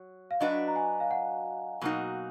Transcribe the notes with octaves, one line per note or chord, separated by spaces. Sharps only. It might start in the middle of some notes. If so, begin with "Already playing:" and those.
Already playing: F#3
F5
F#3 D4 F#4 B4 D#5
A#5
G#5
F5
F#5
B2 F#3 A#3 D#4 F#4